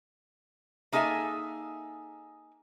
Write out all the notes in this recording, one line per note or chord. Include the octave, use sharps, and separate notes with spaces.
A#3 D#4 G#4 A4 E5 G#5